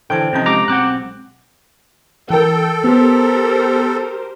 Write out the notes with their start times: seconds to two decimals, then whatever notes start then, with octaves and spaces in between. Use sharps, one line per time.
0.10 D3 E3 A4 C5 G5 A5
0.33 C3 F3 C4 C#4 D#4 A5
0.46 G#3 G4 A#5 D6
0.68 B1 C4 F#5 D6 F#6
2.30 E3 A4 A#4 G5
2.84 B3 G4 A#4 C5